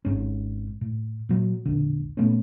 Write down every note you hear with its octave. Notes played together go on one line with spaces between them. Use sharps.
G#1 G#2 C#4
A2
A#2 F#3
E1 A#1 D3
A#2 A3 B3 C#4